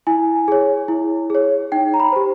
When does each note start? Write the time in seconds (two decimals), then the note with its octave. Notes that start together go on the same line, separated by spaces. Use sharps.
0.07 E4 G#5
0.48 G#4 C#5
0.88 E4
1.30 G#4 C#5
1.72 D#4 G5
1.94 A#5
2.00 B5
2.12 G4 C5